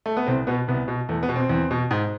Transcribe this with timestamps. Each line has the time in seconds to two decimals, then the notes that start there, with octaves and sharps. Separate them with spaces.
0.06 A3
0.17 B3
0.27 C2 C4
0.47 B2 B3
0.68 C2 B3
0.88 B2
1.09 E2 A3
1.23 B3
1.29 B2
1.36 C4
1.49 E2
1.71 B2
1.91 G#2